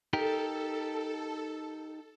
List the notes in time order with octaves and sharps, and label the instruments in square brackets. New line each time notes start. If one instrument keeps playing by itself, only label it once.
[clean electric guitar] D#4 G4 A#4 [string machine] A4